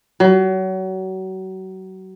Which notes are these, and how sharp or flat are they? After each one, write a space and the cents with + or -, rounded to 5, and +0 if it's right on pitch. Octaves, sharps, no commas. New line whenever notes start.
F#3 +30